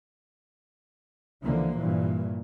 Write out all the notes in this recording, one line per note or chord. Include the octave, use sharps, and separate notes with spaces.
C#2 D3 E3 F3 A#3
G2 A#2 E3